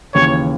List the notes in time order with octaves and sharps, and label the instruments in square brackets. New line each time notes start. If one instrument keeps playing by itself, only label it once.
[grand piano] D#2 C#3 E3 [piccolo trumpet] C#5